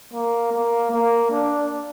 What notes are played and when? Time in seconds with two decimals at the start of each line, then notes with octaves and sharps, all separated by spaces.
0.13 A#3
0.52 A#3
0.91 A#3
1.30 D4